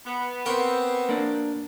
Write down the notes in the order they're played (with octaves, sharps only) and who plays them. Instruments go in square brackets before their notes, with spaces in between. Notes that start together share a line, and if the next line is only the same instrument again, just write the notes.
[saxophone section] B3
[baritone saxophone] B3 [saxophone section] C4 [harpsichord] A#4 G5 C#6
[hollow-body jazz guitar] A#3 D4